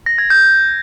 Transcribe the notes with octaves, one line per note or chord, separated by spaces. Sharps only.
A#6
G#6
G6